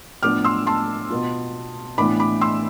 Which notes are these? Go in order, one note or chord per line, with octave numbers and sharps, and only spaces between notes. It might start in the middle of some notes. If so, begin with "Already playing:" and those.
A2 F3 B3 D4 D6 F6
C6 E6
A5 C6
B2 B3 F4
A2 E3 B3 D4 B5 D6
B5 D6
C6 E6